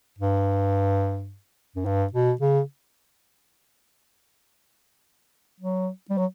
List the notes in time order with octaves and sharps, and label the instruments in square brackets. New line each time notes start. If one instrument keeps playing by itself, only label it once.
[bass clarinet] G2
F#2
G2
B2
C#3
F#3
G3
F#3